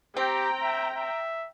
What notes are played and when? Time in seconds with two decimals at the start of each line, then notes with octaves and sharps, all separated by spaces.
0.17 C4 G4 G5 A#5
0.63 E5
0.95 E5